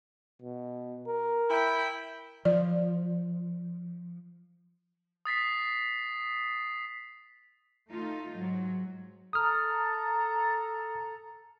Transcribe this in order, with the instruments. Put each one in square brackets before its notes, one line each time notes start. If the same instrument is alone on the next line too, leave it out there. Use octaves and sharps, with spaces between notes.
[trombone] B2
A#4
[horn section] E4 G5
[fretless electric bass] F3 [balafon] D5
[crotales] D#6 A6 B6 C7
[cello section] A3 D#4 F4
G#2 F#3
[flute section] A4 A#5 [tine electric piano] D#6 F6